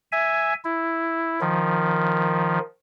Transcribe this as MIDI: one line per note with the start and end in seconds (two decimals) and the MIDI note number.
0.12 0.54 76
0.12 0.54 80
0.65 1.40 64
1.41 2.59 51
1.41 2.59 53